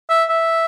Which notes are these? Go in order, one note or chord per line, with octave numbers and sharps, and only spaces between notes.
E5
E5